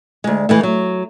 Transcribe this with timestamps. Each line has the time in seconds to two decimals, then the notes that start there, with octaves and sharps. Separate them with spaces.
0.24 D2 G#3
0.49 E3 G#3 A3
0.63 F#3